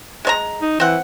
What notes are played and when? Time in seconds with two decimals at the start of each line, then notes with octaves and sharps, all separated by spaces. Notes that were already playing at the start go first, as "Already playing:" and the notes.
0.25 G#3 C#5 A#5
0.62 D#4
0.80 E3 C4 F#5